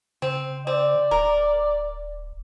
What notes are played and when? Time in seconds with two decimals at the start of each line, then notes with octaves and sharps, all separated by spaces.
0.22 C#3 C4
0.67 C4 D5
1.11 D1 A#4